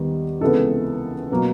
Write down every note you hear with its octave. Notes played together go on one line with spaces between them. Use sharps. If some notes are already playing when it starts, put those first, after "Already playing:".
Already playing: D#2 D#3 G3 B3
C#2 C3 E3 G#3 B3 A4
B2 F#3 A#3